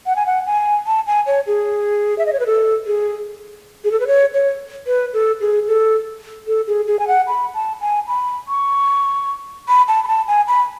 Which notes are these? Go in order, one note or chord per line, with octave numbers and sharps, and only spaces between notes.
F#5
G#5
F#5
G#5
A5
G#5
C#5
G#4
E5
D#5
C#5
B4
A4
G#4
G#4
A4
B4
C#5
C#5
B4
A4
G#4
A4
A4
G#4
G#4
G#5
F#5
B5
A5
G#5
B5
C#6
B5
A5
B5
A5
G#5
B5